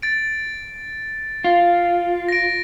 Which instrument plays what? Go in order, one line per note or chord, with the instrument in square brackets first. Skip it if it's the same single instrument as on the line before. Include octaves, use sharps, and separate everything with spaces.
[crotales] A6 D7
[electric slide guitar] F4
[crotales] A#6 D7